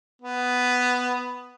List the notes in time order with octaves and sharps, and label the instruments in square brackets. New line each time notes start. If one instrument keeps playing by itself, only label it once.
[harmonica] B3